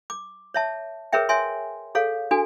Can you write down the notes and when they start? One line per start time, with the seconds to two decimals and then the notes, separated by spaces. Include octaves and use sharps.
0.10 D6
0.54 C#5 E5 A5
1.13 G#4 A#4 B4 C#5 E5 G5
1.29 C#5 E5 G#5 C6
1.95 G#4 A4 C#5 F5
2.31 D4 F#4 A4 G#5